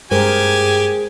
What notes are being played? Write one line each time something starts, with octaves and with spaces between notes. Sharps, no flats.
G2 G#3 G4 G#4 A#4 C5 G#5